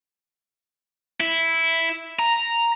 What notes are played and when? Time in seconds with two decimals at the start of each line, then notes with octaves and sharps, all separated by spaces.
1.20 E4
2.19 A#5